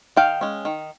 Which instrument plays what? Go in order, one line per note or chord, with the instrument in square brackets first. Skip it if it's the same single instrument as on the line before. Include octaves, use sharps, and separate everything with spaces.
[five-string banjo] D#3 F5 G5
G#3 C#4
D#3